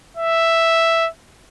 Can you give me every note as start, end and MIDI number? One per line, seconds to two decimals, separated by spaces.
0.17 1.07 76